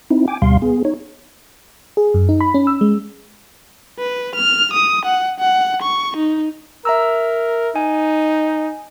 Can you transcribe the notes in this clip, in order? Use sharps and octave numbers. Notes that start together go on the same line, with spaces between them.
C4 D#4 E4
G5 G#5 D6
D2 B2 G3 F5 C6
B3 G#4
D#4 C#5
G#4
F#2
D#4
B5
C#4
E6
G#3
B4
F6
D#6
F#5
F#5
C#6
D#4
A#4 E5 A#5 E6
D#4 G#5